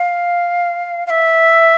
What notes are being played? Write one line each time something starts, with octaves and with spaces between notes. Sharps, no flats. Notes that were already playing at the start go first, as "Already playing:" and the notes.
Already playing: F5
F5
E5